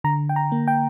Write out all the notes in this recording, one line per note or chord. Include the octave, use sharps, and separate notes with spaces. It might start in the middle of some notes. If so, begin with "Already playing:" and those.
D3 A#5
G5
A#5
A#3
G5